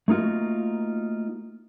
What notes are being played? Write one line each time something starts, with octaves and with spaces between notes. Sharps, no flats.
A3 A#3 D#4 F4 F#4